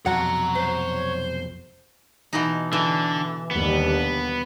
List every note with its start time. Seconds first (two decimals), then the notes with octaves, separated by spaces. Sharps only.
0.06 F1 B1 F2 F#4 C#5 F#5 A#5
0.55 C5
2.33 B2 E3 D#4
2.73 D3 E3
3.51 D#2 D3 G3 B3